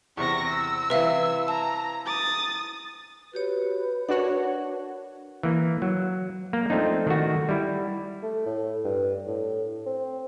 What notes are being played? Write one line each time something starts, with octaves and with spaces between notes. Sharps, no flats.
E2 C3 C#6 A#6
E6
C3 E3 B4 E5 F5
A5 A#5
D#6 A6
F#4 G4 B4 C#5
D4 F#4 A#4 C#5 F#5
E3 A#3
F#3
A#3
F3 A3 C4 D4 D#4
D#3 A3 F#4
G3 E4
A3
A2
G2
A2
C4